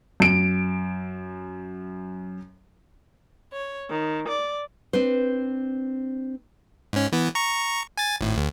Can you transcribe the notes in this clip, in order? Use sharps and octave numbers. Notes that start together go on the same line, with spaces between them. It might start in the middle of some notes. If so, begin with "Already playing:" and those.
F#2 D7
C#5
D#3
D5
C4 D4 B4 C5
G#2 C#4
E3 B3
A#5 C#6
G#5 A6
G#1 A2
D2